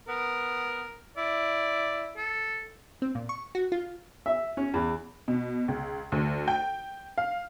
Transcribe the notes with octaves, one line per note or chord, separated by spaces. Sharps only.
B3 A#4
E4 D5
A4
C4
A#2
C#6
F#4
F4
E5
C#4
E2
B2
C#2
D2
G5
F5